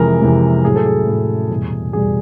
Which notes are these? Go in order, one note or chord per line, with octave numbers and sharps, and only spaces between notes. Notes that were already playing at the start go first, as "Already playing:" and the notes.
Already playing: F2 C3 E3 G#3 A#4
F2 C3 E3 G#3
A2 F#3 G#4
A4
G#4
A2 F#3
E2 B2 G3
E2 B2 G3 G#4